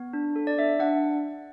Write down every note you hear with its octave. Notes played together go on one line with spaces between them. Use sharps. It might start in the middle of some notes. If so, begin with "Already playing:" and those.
Already playing: B3
D4
A4
D5
D4 E5
D4 F#5